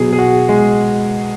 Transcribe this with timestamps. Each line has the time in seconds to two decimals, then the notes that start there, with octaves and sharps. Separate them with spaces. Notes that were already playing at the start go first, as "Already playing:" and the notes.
Already playing: B2 F#3 G#4
0.13 G#4
0.19 F#4
0.49 G#3